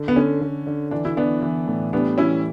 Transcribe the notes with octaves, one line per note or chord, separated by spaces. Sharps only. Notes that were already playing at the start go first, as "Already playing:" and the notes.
Already playing: D3
B3
D3 C#4
D3
D3
E3 D4
E4
E3 B3 D4
E3
A2
G3 B3 D4
E3 C#4 E4